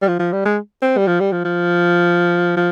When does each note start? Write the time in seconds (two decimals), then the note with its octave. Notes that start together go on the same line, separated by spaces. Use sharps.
0.02 G3
0.08 F3
0.19 F3
0.33 G3
0.45 G#3
0.82 C4
0.98 G3
1.07 F3
1.20 G3
1.32 F3
1.45 F3
2.57 F3